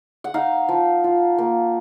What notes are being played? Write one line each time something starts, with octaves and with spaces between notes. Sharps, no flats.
F#5
D#4 F5
F3
F4
A#3